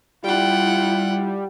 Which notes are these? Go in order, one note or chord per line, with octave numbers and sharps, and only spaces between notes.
G3 E4 F4 F#5 G5